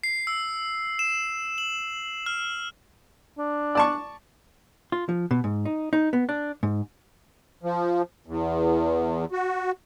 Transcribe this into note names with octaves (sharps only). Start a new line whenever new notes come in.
C7
E6
E7
F#7
F6
D4
D5 A5 C#6
F4
F3
B2
G#2
D#4
D#4
B3
D4
G#2
F3
E2
F#4